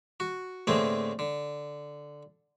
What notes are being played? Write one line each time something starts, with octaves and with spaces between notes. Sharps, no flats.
F#4
A2 D3 A3 A#3 C4 G#4
D3